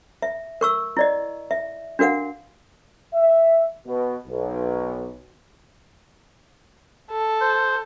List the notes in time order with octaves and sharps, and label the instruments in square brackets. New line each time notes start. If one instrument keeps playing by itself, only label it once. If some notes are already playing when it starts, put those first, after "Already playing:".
[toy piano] E5
A#4 C#6 E6
E4 D5 D#5
E5
D4 F#4 A#4 F5 F#5
[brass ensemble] E5
B2
B1
[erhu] A4
[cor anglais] C5